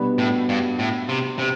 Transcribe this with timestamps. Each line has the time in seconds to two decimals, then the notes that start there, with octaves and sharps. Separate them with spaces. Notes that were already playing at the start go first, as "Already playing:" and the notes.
Already playing: B2 G3 B3 D4 F#4
0.18 A2
0.49 G2
0.79 A2
1.09 C3
1.39 C3